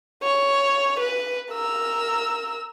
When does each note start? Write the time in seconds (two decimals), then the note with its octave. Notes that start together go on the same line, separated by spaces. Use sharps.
0.23 C#5
1.00 B4
1.51 A#4 E6